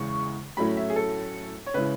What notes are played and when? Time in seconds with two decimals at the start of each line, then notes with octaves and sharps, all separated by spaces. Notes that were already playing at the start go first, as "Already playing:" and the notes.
Already playing: E2 C#3 E3 G#3 C#6
0.57 A2 F#3 A3 C#4 E4 B5
0.77 E5
0.90 G#4
0.96 A4
1.66 C#5
1.74 C#3 G#3 C#4 E4 B4